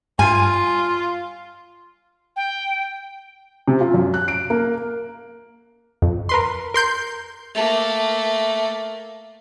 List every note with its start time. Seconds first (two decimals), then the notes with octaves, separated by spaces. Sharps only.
0.19 G2 G3 F4 G#5
2.36 G5
3.68 C3
3.81 F4
3.94 F#2
4.14 F#6
4.28 D7
4.50 A#3
6.02 F2
6.29 A#4 B4 C6
6.74 A#4 C6 G6
7.54 A3 A#3